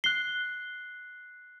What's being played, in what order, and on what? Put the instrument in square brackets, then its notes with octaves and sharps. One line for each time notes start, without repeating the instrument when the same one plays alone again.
[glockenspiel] F#6 C7 [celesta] G7